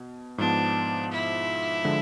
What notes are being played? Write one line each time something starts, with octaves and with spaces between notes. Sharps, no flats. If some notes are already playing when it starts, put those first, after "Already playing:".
Already playing: B2
G#2 F3 B3 D4
E4
D3 F3 G#3